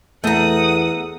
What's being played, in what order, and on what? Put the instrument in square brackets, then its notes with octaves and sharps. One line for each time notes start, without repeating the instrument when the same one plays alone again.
[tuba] E2 [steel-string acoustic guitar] A3 A#5 [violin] F#5 D#6